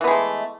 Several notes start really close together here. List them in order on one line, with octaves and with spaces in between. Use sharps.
E3 B3 G#3 A3